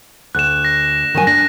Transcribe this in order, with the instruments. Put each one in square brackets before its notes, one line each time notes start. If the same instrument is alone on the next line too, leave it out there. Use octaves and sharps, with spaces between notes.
[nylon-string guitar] D2 [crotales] F#6 E7
[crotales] A#6
[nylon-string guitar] D#3 F#3 G#5
[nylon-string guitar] D4 [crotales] A#6